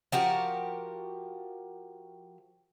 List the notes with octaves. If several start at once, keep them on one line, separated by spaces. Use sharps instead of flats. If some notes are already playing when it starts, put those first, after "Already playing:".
F3 F#4 G4 A#4